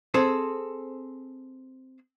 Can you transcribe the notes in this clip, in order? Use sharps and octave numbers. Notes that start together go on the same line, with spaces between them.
C4 G#4 A4 C5